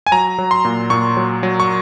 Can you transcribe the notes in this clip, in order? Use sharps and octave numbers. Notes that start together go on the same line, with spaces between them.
G#5
F#3 A#5
F#3
C6
A#2
A#2 C#6
F#3
F#3
C#6